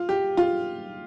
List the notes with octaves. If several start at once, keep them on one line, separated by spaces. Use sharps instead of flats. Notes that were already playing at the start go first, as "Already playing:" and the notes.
Already playing: F4
G4
F4